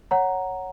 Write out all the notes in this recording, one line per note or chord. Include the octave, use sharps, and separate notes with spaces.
C#5 F#5 A#5